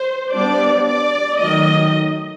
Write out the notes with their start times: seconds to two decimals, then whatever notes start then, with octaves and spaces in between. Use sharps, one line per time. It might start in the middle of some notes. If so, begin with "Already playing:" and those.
Already playing: C5
0.34 G3 B3 D4 D5
0.87 D5
1.40 D#3 F#3 A3 D#5